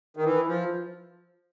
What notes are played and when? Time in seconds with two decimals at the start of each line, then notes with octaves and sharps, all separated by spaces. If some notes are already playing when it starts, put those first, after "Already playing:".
0.17 D#3
0.25 E3
0.48 F3